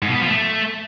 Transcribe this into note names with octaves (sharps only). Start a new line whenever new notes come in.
G#2
B2
B3
F3
A3